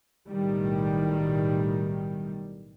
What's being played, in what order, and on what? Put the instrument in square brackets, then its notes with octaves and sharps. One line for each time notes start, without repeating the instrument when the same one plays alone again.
[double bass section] B1 A2 D#3 G3